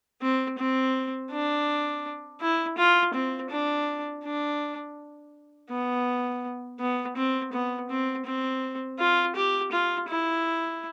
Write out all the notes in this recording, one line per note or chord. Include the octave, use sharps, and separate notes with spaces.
C4
C4
D4
E4
F4
C4
D4
D4
B3
B3
C4
B3
C4
C4
F4
G4
F4
E4